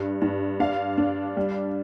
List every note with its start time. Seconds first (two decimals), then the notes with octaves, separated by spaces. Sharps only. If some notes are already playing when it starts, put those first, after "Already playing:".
Already playing: G2
0.21 G2
0.60 D4 F5
0.98 D4
1.37 G3